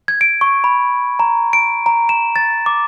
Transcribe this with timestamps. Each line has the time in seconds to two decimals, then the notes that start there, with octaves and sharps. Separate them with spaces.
0.08 G#6
0.21 D7
0.41 C#6
0.64 B5
1.19 A#5
1.53 D7
1.86 A#5
2.09 E7
2.36 A6
2.66 D6